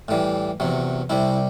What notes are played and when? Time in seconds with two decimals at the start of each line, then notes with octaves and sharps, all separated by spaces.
0.08 A2 E3 G3
0.60 E2 C3 F#3
1.10 C2 C3 G3 E4